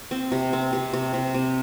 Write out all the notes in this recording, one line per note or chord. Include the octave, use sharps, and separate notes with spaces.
C4
C3
C4
C3
C3
C3
C3